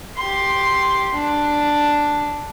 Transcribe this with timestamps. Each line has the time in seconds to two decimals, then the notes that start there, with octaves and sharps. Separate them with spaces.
0.17 G4 C6
1.15 D4